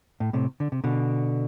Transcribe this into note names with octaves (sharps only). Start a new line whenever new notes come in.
A2
A2 C3
D3
C3
B2 D3